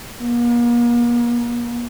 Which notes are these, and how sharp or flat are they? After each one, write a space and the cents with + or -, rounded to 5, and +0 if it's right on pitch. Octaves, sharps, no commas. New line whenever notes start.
A#3 +40